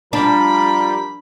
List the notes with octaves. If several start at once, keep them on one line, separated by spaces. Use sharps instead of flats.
F3 G3 D4 A#4 B5